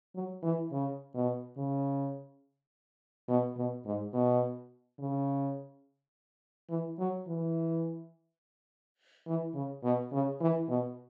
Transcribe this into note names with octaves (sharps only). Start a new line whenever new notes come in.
F#3
E3
C#3
B2
C#3
B2
B2
G#2
B2
C#3
E3
F#3
E3
E3
C#3
B2
C#3
E3
B2